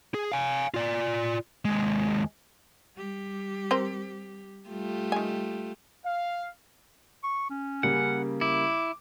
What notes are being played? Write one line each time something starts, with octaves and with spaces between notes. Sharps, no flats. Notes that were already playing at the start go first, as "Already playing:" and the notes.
G#4
F5 G#5
F4 D5
D#2 G#3
G3 G4
C4 A#4 C5
G3 A3 F4 G4
D#3 G#5
F5
C#6
C#4
C#3 G3 A#3 F#5
E4 D6